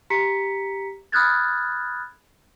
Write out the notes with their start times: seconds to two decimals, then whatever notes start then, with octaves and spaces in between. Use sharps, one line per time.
0.10 G4 A#5 B6 C#7
1.12 B5 D#6 F6 F#6 G#6 A6